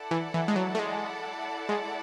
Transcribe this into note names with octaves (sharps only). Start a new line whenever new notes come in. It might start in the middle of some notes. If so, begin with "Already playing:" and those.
Already playing: E4 A4 D5 F#5 A5
E3
E3
G#3
F#3
A3
G#3
G#3